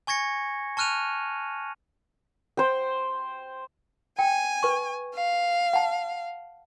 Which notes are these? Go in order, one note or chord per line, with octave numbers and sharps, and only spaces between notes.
G#5 C#6 G#6 A#6 C#7
A5 C#6 F6 F#6 D#7 F7
C5 G5
G5 G#5
B4 C#6
F5
F#5 A5